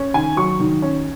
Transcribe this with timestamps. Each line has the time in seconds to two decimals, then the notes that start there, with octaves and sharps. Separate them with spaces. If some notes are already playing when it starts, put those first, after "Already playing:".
Already playing: C#4
0.14 D#3 G#5
0.37 F#3 C#6
0.60 D#3
0.82 C#4